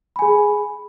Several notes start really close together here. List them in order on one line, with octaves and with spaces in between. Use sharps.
B5 G#5 G#4